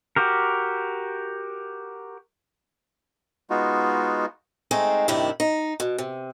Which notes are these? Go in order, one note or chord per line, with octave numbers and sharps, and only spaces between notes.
F#4 G4 A#4
G#3 B3 D#4 F4 F#4
G#3 A3 C4 D#4
G2 C3 D#3 A3 D4 E4
D#4
B2
C3